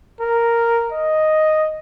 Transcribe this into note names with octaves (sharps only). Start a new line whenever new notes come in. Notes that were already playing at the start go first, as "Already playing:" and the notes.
A#4
D#5